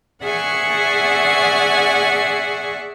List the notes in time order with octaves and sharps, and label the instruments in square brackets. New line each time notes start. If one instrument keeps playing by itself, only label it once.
[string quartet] G#4 D5 E5 F#5 G#5 C#6